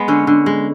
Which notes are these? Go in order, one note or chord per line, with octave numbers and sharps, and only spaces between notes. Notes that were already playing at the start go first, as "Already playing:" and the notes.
Already playing: G#3 B3
D3 C#4
D3
G#3